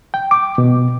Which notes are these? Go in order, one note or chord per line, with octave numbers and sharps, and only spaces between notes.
G5
D6
B2